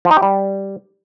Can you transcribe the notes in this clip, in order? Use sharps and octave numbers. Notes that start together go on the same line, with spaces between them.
F3
D#4
G4
G3